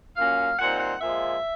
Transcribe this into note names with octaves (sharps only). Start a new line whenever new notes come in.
A#2 F#3 A#3 C#4 F5
A#2 G3 C4 D#4 F#5
F#5
A#2 F3 G#3 E5